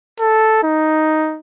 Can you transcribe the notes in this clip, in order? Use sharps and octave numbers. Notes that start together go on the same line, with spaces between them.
A4
D#4